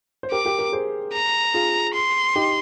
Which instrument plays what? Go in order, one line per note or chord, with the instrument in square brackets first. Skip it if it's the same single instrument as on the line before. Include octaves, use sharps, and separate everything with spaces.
[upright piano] C5
[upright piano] G4 A#4 [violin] D6
[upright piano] G4 A#4
G4 A#4
G#4 C5
[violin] A#5
[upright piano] F4 G#4
[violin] C6
[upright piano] D#4 G4